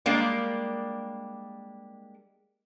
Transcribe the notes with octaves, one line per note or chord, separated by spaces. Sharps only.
G3 G#3 A#3 D4